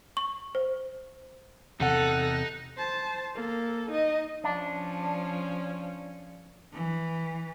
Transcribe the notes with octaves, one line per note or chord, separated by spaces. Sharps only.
C#6
C5
E2 C3 D#4 A4 F#5 F#6
C5 A5
A#3 A4
D#4 D#5
F3 C#4 D4
E3